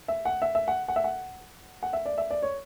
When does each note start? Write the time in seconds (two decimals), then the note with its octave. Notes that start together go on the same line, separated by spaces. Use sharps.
0.08 E5
0.25 F#5
0.42 E5
0.55 E5
0.68 F#5
0.88 F#5
0.96 E5
1.04 F#5
1.83 F#5
1.93 E5
2.06 D5
2.18 E5
2.31 D5
2.42 C#5